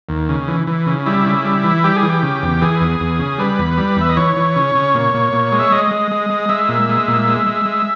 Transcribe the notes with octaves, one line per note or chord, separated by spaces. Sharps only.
D#2
C#3
E3
E3
C#3
G3 E4
C#3
G3
E3
G3 G4
G#4
E3
G4
C#3
E2
E3 G#4
E2
E2
C#3
G3 B4
E2
G3
E2 E5
D#5
E3 C#5
E3
C#3
C#3
A#2
A#2
A#2
G#3
E5
G#3 D#5
G#3
G#3
G#3
G#3 E5
A#2
G#3
A#2
G#3
G#3
G#3